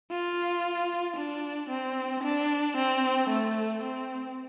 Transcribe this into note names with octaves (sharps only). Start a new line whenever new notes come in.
F4
D4
C4
D4
C4
A3
C4